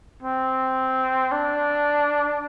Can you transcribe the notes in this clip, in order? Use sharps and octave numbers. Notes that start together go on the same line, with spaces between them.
C4
D4